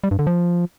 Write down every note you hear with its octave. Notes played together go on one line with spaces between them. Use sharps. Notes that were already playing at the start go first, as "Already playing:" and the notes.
G3
G2
D3
F3